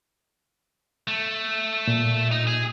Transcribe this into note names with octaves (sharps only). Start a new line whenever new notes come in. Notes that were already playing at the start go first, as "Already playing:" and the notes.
A3
A#2
D#4
G#4